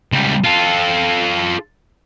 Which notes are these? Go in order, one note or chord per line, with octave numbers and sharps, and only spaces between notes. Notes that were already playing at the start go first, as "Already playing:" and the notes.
C#2 G3
F4 A4